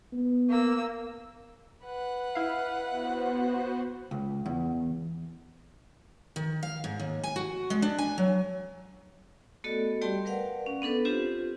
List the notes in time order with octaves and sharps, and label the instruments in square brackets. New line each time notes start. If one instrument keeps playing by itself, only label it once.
[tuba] B3
[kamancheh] A#3 E6
[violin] B4 F#5
[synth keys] E4 F5
[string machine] B3 F#4 C5
[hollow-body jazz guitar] C#2
E2
[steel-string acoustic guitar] D#3
F5
G#2
D#2
G#5
F#4
G#3
D4
G#5
F#3
[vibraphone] A3 B3 F#4 A4 D5 D#5
G3 G4 D5 G5 A5 C6
A#4 B4 D5 F5 F#5
C#4
B3 D4 A4 B4
C4 F4 G4 C5